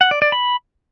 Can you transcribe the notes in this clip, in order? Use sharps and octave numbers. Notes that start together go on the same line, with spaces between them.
F#5
D5
D5
B5